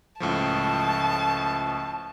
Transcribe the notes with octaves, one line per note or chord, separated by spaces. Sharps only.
C#2 A2 F3 A5